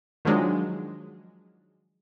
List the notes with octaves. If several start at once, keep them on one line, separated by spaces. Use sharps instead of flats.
D#3 F3 F#3 G#3 D4